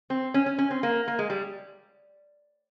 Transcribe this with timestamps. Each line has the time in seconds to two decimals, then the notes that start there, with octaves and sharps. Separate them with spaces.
0.10 C4
0.34 C#4
0.46 C#4
0.58 C#4
0.71 C4
0.83 A#3
1.08 A#3
1.19 G#3
1.30 G3